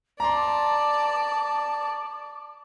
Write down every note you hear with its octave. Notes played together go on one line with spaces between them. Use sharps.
D5 A5 A#5 C6 D6